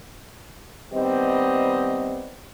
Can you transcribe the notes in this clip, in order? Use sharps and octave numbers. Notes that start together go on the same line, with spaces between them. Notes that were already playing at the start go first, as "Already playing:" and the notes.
D#3 G3 B3 C4 D#5